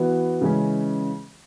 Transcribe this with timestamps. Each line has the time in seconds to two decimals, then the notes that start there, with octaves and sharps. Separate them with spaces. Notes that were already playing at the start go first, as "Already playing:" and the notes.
Already playing: E3 B3 F#4
0.41 C#3 E3 G#3 C#4